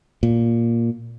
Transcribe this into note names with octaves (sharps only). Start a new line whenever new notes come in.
A#2